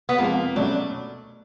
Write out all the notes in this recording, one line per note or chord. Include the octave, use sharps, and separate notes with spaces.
B3
F2 C3 F3 G#3 A#3
B2 F#3 A3 C#4 D4